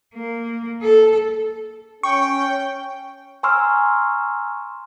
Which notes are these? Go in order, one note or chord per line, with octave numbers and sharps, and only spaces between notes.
A#3
A4
C#4 G5 C#6
G#5 A#5 C6 C#6 E6 F6